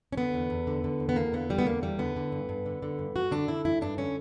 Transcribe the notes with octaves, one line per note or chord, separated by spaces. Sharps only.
C#4
D3 B3
E2
E2
D3
D3
E2
B3
E2 A#3
D3 B3
D3 G3
B3
E2 A#3
E2 G3
D3 B3
D3
G2
G2
D3
D3
G2
G2 F#4
D3 D4
D3 E4
G2 E4
G2 D4
D3 C#4